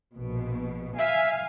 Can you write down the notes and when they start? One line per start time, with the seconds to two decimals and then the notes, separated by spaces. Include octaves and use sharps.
0.15 A#1 B2
0.99 E5 F5 G#5